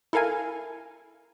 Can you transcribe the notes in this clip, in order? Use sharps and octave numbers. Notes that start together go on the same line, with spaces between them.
E4 A4 A#4 F5 G#5